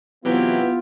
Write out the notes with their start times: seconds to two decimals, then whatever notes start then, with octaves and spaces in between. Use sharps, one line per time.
0.25 C3 E3 F#3 B3 E4 F4 G4